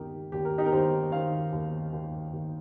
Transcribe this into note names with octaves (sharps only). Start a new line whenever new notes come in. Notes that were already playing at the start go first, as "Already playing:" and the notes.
Already playing: D#2 D#3 D#4 G4 A#4
D#2 G4
A#4
D#4 G4
A#4
D#2 G4 C5
D#3 C5 F5
D#2
D#2
D#2